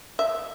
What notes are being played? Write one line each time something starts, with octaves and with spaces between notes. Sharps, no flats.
E5